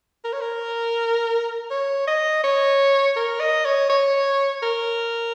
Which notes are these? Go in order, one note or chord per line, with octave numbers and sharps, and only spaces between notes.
A#4
C#5
A#4
C#5
D#5
C#5
A#4
D#5
C#5
C#5
A#4